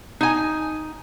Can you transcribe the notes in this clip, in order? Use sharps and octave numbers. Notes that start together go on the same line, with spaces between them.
D#4 G#5